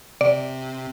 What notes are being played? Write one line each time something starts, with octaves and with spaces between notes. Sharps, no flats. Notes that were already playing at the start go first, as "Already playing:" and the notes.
C3 D5